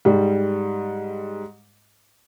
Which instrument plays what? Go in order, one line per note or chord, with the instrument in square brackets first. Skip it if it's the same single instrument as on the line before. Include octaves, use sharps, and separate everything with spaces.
[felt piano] G#2 G3